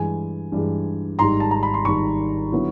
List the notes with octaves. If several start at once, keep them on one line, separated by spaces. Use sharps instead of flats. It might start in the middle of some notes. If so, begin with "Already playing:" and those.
Already playing: G2 E3 G#3 G#5
G2 E3 G#3
G#1 G#2 D#3 G3 A#5 C6
A5
A#5
B5
C6
G#1 G#2 D#3 G3 B5 C#6
D3 F#3 B3 E4